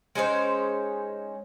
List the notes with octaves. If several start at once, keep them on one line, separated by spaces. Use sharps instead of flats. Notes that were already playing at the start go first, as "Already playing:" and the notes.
G#3 C#4 D#4 C5